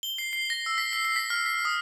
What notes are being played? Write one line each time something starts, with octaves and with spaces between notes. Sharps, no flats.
G7
C7
C7
A#6
E6
B6
C7
C7
B6
F6
B6
D#6